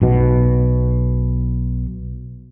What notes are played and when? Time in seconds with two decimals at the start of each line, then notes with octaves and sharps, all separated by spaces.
0.02 B1 B2